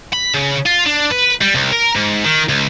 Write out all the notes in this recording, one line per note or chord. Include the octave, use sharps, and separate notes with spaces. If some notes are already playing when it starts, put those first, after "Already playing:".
B5
C#3
F4
D4
B4
G3
C2
A#4
G#2
D#3
C#2